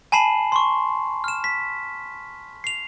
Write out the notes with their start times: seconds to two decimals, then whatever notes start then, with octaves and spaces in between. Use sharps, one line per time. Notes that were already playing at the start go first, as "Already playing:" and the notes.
0.12 G#5 A5 B5 C7 E7 F#7
0.52 C6 C#6
1.24 F6 E7
1.44 B6
2.64 C7 F7